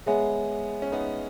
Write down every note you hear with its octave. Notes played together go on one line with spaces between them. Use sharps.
G#3 B3 G#4 C#5 E5 G#5
C#4
B3 D#4